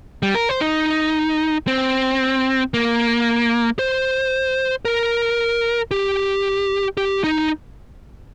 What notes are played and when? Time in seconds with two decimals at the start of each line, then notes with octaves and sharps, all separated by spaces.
0.23 G3
0.35 A#4
0.49 C5
0.61 D#4
1.68 C4
2.74 A#3
3.79 C5
4.85 A#4
5.91 G4
6.97 G4
7.24 D#4